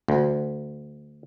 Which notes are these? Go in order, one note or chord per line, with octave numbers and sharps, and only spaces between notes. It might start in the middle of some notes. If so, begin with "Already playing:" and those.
D2